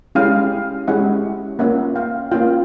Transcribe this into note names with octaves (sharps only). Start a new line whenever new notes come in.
G#3 C#4 E4 G4 F5 G5
G#3 C#4 E4 G4 E5 F#5
A#3 C#4 F4 E5 F#5
F5 G5
A#3 C#4 F4 F5 G5